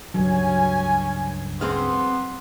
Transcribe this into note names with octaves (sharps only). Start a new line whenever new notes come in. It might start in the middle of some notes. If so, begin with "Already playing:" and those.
C#2 G2 F#3 C#4 G#5
B3 C4 G#4 F5 C6